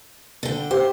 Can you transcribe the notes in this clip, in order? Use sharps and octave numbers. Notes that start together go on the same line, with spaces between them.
D3 G5
G4 C5